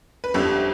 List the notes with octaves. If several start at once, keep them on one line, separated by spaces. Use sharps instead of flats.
B4
G1 F2 D3 G3 A4